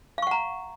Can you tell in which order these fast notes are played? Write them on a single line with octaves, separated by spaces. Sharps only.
F5 C#6 F#5 A#5